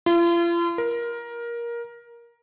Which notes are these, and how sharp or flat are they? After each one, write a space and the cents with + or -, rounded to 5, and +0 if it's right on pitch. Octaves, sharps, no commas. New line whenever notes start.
F4 -40
A#4 +15